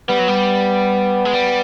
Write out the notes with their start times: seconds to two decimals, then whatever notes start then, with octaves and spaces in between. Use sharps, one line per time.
0.09 G3 B3
0.19 F#3
0.28 G3
1.25 G#3
1.33 G3